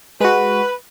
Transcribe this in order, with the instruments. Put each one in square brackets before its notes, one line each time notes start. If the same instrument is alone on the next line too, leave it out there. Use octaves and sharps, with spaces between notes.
[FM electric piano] G#3 F#4 [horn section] B4